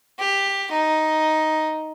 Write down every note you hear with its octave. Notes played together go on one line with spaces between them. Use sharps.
G4
D#4